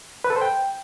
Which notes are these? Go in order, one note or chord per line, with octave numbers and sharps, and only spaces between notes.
B4
A4
C5
G5